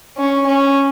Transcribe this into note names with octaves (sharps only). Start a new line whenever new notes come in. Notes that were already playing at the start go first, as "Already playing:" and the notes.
C#4
C#4